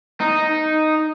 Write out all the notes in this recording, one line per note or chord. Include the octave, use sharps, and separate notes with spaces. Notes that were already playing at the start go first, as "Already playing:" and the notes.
D#4